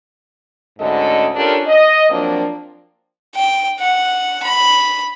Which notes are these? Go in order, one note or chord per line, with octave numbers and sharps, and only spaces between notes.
D2 G#2 D3 C#4 A4 D#5
C#4 D4 F4 G4 A4 A#4
D#5
F3 F#3 A#3 C4 D4
G5
F#5
B5